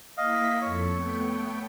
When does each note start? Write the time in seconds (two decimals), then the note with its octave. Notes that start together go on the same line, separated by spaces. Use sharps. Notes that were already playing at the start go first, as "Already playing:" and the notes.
0.18 A#3 E4 D#5 F5 B6
0.62 F2 A4 C#5
0.93 A3 B3 G5